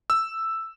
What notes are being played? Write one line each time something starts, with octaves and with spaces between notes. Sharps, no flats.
E6